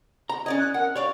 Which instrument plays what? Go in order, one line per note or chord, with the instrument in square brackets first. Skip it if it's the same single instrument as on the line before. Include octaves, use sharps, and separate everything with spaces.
[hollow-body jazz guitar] A#5
[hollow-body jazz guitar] C#4 D5 D#5 [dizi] G#6
[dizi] F#6
[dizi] A#4 [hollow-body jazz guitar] F#5
[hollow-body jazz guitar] C#5 D5 F5 [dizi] C#6